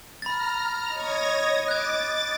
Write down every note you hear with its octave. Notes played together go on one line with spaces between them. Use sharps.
A#5 B5 F6 A6
C#5 D#5 G#6 A#6
D6 F#6 G#6 A6